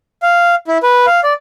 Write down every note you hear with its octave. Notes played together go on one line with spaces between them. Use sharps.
F5
E4
B4
F5
D5